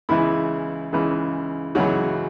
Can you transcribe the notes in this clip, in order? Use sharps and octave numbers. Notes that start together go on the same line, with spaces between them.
C#2 C#3 E3 E4
C#2 C#3 E3
C#2 C#3 E3 F#3 F#4